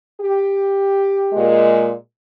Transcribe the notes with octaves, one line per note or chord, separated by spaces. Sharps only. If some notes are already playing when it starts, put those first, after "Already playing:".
G4
A#2 G#3